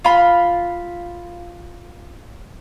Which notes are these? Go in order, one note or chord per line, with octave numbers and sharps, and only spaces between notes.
F4 B5